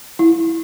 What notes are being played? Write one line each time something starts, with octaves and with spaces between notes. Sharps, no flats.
E4